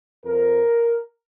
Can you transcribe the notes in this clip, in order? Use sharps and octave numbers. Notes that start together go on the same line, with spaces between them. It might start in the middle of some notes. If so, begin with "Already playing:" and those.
F2 F3 A#4